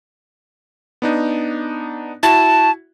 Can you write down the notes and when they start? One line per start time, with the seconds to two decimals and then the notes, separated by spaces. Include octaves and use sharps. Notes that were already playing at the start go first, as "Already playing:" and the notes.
1.02 B3 D4 D#4
2.23 E4 F#4 A5